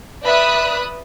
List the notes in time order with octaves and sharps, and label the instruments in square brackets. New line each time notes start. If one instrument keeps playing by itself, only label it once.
[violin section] B4 D5 E5 B5 D#6 F#6